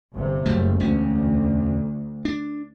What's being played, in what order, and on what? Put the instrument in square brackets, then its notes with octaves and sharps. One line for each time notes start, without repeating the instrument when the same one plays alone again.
[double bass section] G1 C3
[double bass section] F#1 [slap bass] F#2 G3 A3
[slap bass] E1 C#4 [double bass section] D2
[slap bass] D4